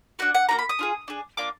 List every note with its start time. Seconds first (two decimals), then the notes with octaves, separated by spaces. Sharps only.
0.19 D4 F#4 F#5
0.35 F#5
0.49 A#3 D4 F#4 A#5
0.59 B5
0.69 D#6
0.79 D4 F4 G#4
1.08 D4 G#4
1.37 A#3 D4 F4 D6